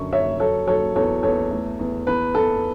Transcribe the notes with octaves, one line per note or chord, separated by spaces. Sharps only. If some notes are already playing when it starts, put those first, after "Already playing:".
Already playing: F#2 D3 C#6
F#2 C#5 E5
F#3 A4 C#5
F#3 A4 C#5
E2 A4 C#5
E2 A4 C#5
A3
E2
E2 B4
E2 A4